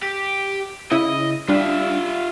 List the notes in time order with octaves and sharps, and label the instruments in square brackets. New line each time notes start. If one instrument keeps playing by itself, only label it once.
[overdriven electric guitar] G4
[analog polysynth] C#3 E4 [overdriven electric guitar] D#5
[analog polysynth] G3 D4 [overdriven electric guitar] F4 E5